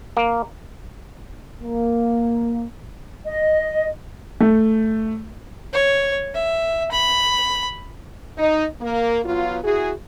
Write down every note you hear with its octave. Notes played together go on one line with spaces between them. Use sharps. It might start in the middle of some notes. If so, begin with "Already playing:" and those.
A#3
A#3
D#5
A3
C#5
E5
B5
D#4
A#3
F#3 B3 F4
E4 F#4 G#4